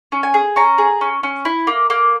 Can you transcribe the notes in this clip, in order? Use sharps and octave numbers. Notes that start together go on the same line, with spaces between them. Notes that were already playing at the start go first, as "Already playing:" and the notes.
C#4
G#5
G#4
C#4 A#5
G#4
C#4
C#4
E4
A#3
A#3